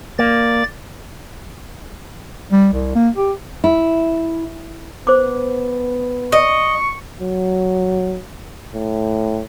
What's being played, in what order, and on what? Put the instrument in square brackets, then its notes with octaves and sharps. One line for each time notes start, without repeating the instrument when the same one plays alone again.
[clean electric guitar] A#3 [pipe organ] D5 A6
[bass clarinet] G3
C2
A#3
G4
[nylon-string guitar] E4
[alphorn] B3 [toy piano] C5 D6
[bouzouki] D#5 [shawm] C#6
[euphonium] F#3
A2